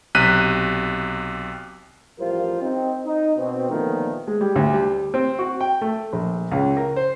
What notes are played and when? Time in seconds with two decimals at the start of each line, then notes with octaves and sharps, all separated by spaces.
0.15 B1 C3 F#6 B6 D#7
2.19 A1 F3 G3 F4 A#4 C5
2.61 C4 D#4
3.05 D#4
3.37 B2 C4
3.69 A#2 D3 D#3 F3 A3 B3
4.27 G#3
4.41 G3
4.56 D2
4.73 G3
5.14 C4
5.39 F#4
5.61 G5
5.81 A3
6.13 A#1
6.51 C#2
6.77 A#4
6.96 C5